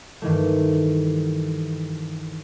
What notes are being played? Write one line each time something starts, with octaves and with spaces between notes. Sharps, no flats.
G2 D#3 E3 A3